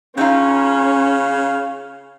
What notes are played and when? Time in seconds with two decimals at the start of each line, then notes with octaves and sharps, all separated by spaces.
0.18 C#3 C4 C#4 D#4 F4 F5